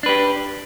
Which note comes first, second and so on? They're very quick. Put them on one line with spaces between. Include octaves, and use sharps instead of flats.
D4 B4 G4